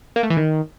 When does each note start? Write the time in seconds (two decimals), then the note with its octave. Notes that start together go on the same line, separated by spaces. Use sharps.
0.16 A#3
0.23 A3
0.30 E3
0.37 D#3